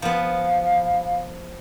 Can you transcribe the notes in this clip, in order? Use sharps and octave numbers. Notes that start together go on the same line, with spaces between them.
F3 B3 F5